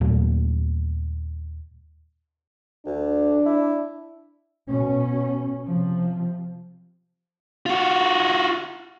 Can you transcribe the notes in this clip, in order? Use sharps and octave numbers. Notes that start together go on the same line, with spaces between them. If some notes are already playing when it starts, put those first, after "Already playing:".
D#2 A#2 F#3 A3
D2 D4
E4
B2 C#4
C3 F3
F4 F#4